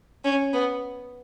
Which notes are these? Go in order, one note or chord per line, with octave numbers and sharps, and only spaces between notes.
C#4
B3